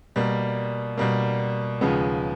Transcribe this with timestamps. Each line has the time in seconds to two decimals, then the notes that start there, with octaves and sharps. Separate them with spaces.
0.16 B2 G3 A#3
0.97 B2 G3 A#3
1.81 D#2 C#3 F3 G#3 B3